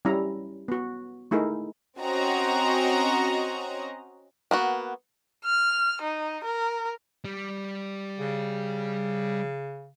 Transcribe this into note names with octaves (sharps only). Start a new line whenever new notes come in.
G3 C#4 E4 A#5
B3 F#4
A3 D#4 E4 G#4 A#4
C4 C#4 F#4 D#5 A#5
A#3 B3 F#4
F6
D#4
A#4
G3
C#3